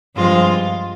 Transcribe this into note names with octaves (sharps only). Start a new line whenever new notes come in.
G2 F3 G#3 C4 F4